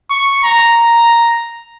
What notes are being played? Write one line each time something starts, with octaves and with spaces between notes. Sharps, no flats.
C#6
A#5